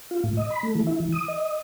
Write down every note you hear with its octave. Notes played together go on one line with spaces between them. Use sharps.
F4
A2
D#5
B5
A3
E3
E4
E3
D#6
D#5